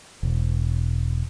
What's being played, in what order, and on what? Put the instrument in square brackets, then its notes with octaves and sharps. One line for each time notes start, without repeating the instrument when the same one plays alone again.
[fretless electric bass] E1